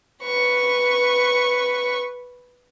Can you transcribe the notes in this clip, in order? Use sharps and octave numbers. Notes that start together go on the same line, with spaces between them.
B4 C#6